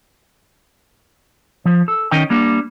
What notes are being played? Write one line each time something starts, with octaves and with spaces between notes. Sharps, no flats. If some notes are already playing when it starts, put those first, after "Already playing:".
F3
A4
D#3 C#4 D#4 D#5 G5
G3 A#3 D4